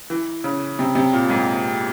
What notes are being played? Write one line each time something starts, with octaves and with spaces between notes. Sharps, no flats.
E3
C#3
C3
C3
A#2
G#2